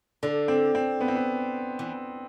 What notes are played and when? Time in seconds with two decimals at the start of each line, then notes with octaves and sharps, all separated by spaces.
0.23 D3 D4
0.48 C4
0.75 C4
1.01 B3
1.08 C4
1.16 B3
1.79 E3